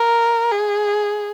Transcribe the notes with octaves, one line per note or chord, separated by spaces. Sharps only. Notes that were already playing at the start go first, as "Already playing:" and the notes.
Already playing: A#4
G#4